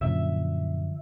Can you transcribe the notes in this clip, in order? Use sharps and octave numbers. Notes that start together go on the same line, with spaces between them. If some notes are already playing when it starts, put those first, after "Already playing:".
F#2 A#2 D3 F3 E5